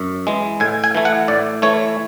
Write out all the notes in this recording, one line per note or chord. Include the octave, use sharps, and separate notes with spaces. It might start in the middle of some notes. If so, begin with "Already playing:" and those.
Already playing: F#2
E3 G#3
A2 G#5
G#5
E3 A3
F#5
A2 D5
E3 A3 C#5